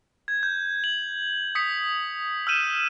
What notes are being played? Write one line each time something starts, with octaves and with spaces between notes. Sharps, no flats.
G#6
G6
F#7
D#6 B6 C#7
E6 F6 G6 D#7 E7